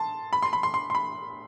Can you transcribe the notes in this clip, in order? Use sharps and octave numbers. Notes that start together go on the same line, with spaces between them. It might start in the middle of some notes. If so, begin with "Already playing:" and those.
Already playing: A5 C6
B5
C6
B5
C6
C6
C6
B5